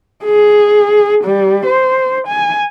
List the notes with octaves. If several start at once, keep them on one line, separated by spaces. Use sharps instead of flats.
G#4
G3
C5
G#5